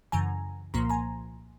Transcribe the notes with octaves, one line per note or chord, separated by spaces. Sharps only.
F#2 C#3 E3 G#5 A#5
C2 A#2 F3 A#3 A#5 C6
G#5 A#5